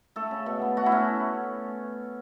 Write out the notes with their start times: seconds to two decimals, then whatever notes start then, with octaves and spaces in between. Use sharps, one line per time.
0.16 A3 A4
0.31 C#3
0.46 B2
0.62 B3
0.77 A3 F#4
0.86 E4
0.92 A3 C#4